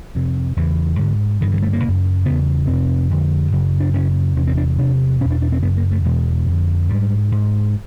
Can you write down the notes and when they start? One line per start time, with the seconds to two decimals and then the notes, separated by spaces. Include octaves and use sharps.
0.15 F2 C3
0.57 E2 C#3 E3
0.99 G#2 D3
1.41 G2 D3 D#3
1.52 E3
1.62 A3
1.73 A#3
1.84 F#2 C#3
2.25 E2 C#3 B3
2.67 F2 C3 C4
3.10 F2 D3
3.52 F#2 C#3
3.80 D4
3.94 F#2 C#3 C#4
4.36 E2 C3 C#4
4.47 C4
4.57 D4
4.78 E2 C3 D4
5.21 E2 B2 C#4
5.31 D4
5.42 D4
5.52 C4
5.62 F#2 C#3 B3
5.77 A#3
5.92 A3
6.04 E2 B2 G#3
6.48 F2 D3
6.89 G#2 G3
7.32 G#2